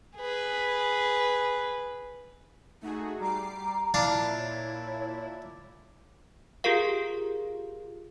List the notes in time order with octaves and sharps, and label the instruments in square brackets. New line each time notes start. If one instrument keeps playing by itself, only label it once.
[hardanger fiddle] G#4 B4
[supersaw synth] A3 F#4 G#4 [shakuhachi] D#4
[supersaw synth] G3 D6 C7 [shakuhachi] A#5
[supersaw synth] A#2 E4 [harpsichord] D4 F5 A5
[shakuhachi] C#5
[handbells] F4 G4 G#4 A#4 F5